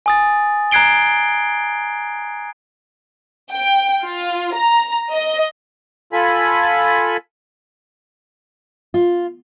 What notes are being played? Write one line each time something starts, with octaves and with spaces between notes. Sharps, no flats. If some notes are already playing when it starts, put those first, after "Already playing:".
G#5 D#6 A6
A#5 F#6 G#6 C7 D7 G7
G5
F4
A#5
D#5
F4 A4 G#5 B5
F4